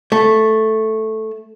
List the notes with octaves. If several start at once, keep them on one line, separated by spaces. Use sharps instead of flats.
A3